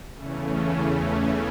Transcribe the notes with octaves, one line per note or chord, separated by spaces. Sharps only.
E2 C#3 E3 A3 C#4